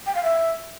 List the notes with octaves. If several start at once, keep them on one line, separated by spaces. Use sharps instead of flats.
G5
F5
E5